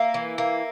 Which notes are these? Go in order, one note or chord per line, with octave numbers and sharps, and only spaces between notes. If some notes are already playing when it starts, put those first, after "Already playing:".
Already playing: A#3 E5
E3
A#3